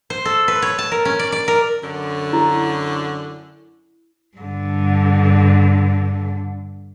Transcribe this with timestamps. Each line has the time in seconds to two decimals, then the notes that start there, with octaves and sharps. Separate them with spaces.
0.10 C5
0.25 A4
0.48 B4
0.62 C#5
0.79 A5
0.91 A#4
1.05 C#4
1.19 D5
1.32 D5
1.48 A#4
1.81 F#2 D3
2.33 E4
4.37 G2 D3